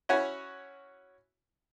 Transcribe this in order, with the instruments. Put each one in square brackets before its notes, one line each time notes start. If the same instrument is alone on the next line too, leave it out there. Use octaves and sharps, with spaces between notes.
[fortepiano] C#4 E4 F#4 C#5 G#5